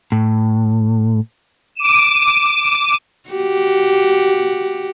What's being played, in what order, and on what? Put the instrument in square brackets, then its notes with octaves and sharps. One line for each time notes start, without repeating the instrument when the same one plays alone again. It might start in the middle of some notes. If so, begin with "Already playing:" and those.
[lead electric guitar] A2
[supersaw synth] D6 D#7 E7
[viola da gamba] F#4 G4